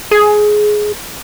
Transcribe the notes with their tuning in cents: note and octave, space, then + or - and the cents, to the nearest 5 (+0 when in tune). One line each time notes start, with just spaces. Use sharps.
G#4 +15